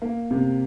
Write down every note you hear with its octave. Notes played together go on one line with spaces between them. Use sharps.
A#3
C3